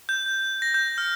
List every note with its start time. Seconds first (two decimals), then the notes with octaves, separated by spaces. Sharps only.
0.09 G6
0.62 A#6
0.74 G6
0.98 F6